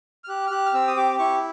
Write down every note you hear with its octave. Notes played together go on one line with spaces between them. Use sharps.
F6
G4 F#6
F6
G4 F#6
F6
C4 E6
D#6
G4 D6
E4 C#6